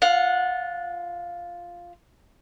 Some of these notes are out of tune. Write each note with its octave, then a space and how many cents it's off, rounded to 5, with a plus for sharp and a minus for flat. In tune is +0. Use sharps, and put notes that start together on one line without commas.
F4 +0 F#5 -25